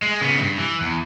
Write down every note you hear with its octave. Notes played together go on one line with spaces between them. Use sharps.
G#3
C#3 B3
G2
E3
E2